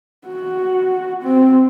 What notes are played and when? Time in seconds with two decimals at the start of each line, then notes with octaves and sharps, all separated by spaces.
0.28 F#4
1.23 C4